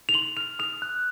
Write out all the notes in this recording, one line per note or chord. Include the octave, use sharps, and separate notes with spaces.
F7
C6 F#7
F6 F7
D#6 F7
F#6